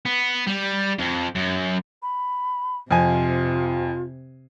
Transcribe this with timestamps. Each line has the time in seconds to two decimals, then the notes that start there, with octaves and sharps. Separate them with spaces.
0.06 B3
0.47 G3
0.99 F2
1.35 F#2
2.02 B5
2.91 F2 C3 F4 G#5